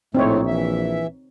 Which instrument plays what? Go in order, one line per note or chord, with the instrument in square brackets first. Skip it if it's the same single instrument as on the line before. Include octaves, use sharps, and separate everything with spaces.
[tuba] A#1 [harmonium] A2 A3 [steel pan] C4 D#4 C#5
[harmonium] E3 E5